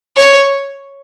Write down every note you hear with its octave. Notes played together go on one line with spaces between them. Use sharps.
C#5